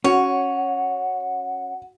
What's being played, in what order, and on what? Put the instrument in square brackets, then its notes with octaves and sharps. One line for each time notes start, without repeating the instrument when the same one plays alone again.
[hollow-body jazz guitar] C#4 [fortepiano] F#4 [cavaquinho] C#5 [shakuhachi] F#5